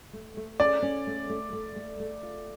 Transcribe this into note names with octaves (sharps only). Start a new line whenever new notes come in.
A3
A3
C#4 D5
C#4
A3
A3
A3
A3
A3
F4